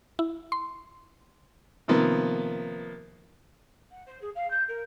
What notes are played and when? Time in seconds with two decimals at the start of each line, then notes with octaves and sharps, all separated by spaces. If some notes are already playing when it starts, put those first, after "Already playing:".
0.19 E4
0.52 C6
1.88 C3 D#3 F3 A#3 B3
3.91 F#5
4.06 C5
4.21 G#4
4.35 F5
4.50 G6
4.67 A#4